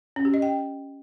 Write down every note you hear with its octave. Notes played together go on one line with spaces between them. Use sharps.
C#4
G4
D#5
G5